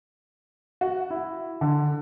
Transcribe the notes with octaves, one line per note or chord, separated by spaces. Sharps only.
F#4
E4
D3